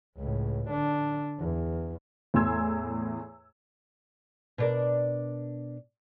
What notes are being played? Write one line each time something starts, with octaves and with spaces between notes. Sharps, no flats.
C#2 A2
D3 D4
E2
E2 A2 G#5 C6 E6 G#6
B2 D4 A#4